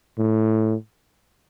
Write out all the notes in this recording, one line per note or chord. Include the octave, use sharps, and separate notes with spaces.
A2